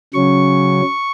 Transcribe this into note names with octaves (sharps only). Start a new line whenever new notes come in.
C#3 F#3 C#4 C#6